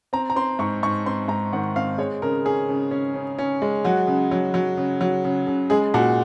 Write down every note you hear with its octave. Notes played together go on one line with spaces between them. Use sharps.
C4 A#5
A#5
C4 C6
G#2 C#6
G#2 C#6
C4 C6
G#2 A#5
D#3 F#5
C4 F5
G#3 C#5
C#3 A#4
C#4 G#4
C#3
C#4
C#3
C#4
G#3
F#3 F#4
C#3
F#3
F#3
C#3
F#3
C#3
C#3
G#3 G#4
A#2 F#4